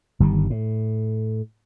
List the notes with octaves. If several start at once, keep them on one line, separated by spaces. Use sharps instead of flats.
G1 D#3 G3
A2